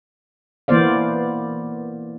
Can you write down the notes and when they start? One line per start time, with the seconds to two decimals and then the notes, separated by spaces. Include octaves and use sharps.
0.68 E3 A#3 B3 C5 D5 F5